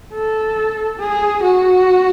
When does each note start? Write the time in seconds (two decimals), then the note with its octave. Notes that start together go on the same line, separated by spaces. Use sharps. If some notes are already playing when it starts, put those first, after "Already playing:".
0.14 A4
0.99 G#4
1.43 F#4